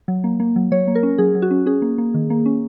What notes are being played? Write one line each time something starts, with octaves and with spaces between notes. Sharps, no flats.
F#3
A#3
A#3
F#3
F#3 C#5
A#3
A#4
C#4
F#3 G#4
F#3
F#4
C#4
C#4 G#4
A#3
A#3
D#3
A#3
C#4